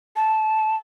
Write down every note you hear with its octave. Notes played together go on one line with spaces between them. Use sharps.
A5